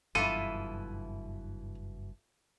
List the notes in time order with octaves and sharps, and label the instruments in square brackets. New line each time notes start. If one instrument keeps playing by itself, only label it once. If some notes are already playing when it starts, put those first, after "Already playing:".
[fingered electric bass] F#1 G2 [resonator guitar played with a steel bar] B2 E3 E4 [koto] F4 A4 [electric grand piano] D#7